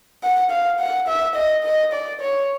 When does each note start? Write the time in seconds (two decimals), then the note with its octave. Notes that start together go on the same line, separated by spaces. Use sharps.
0.24 F#5
0.51 F5
0.80 F#5
1.08 E5
1.36 D#5
1.64 D#5
1.93 D5
2.21 C#5